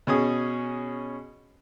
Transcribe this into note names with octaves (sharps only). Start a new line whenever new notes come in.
B2 C#4 G#4 D#6